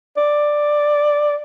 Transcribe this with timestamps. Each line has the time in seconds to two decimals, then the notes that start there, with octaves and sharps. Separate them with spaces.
0.17 D5